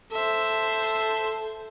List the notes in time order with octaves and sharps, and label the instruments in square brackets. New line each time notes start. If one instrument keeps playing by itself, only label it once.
[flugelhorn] A4 [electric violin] C5 E5